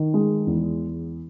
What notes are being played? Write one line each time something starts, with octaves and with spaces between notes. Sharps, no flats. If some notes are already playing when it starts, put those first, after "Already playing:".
Already playing: D#3
G#3
E2